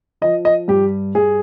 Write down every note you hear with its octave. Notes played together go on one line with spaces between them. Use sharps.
F3 D#5
D#5
G2 G4
G2 G#4